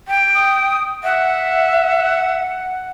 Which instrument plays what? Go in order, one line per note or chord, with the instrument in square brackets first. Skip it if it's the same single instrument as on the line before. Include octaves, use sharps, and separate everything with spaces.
[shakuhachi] G5
[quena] D#6
[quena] E5 [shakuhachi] F#5